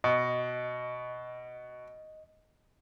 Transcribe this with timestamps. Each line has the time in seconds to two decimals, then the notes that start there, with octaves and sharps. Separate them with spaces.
0.04 B2 D#5